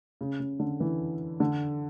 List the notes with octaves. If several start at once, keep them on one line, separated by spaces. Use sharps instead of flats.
C#3
C#3
D3
E3
D3